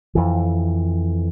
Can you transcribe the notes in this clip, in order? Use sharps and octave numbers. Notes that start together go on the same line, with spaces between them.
F2 E3